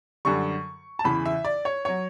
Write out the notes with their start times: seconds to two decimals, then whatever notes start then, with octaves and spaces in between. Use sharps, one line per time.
0.25 F#2 D3 G3 C#6
0.99 A5
1.04 E2 C#3 E3 B5
1.25 E5
1.45 D5
1.65 C#5
1.85 F#3 C#5